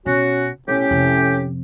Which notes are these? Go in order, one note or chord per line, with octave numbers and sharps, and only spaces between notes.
B2 C#4 F#4
B1 A2 C#4 G4
F2 C3